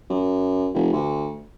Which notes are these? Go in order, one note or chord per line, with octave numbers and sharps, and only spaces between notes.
F#2
F1
D2